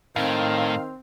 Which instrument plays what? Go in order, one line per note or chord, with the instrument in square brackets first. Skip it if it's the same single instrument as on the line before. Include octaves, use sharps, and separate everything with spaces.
[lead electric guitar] A2 [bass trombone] D#3 [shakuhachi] C4 [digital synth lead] F5